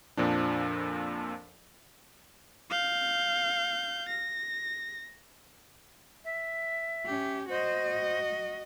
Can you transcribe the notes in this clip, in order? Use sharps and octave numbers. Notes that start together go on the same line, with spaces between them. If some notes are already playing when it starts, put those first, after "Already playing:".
F2 A#2 F3 D4
F5 G6
A#6
E5
C#4 G4
F#4 C5 D#5